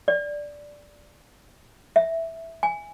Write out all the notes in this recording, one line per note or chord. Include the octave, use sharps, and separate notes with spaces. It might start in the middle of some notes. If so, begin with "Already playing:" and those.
D5
E5
G#5